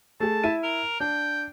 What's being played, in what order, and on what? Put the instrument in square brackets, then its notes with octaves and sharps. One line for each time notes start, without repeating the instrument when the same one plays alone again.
[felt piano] A3 G#4 [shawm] A5
[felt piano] E4 E5 D#7
[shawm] A#4
[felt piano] D4 [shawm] G5